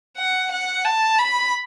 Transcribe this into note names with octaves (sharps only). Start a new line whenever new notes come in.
F#5
F#5
A5
B5